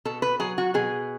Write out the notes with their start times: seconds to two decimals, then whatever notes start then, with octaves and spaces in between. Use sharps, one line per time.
0.05 B2 A4
0.22 B4
0.40 F#3 G#4
0.58 F#4
0.74 B2 G#4